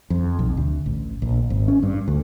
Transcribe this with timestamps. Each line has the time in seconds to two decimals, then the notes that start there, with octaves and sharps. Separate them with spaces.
0.10 F2
0.39 B1
0.57 D2
0.86 A1
1.22 A#1
1.50 G#1
1.68 C#4
1.83 G2
2.08 D2